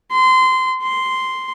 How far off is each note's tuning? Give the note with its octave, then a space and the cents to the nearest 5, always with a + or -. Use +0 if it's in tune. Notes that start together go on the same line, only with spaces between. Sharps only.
C6 -20
C6 -5